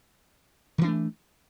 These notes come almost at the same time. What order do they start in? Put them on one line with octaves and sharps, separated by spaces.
D#3 E3 D4 A3